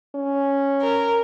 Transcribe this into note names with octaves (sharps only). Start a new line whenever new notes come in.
C#4
A#4